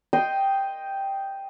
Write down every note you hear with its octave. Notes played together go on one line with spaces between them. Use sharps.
D#5 G5 C6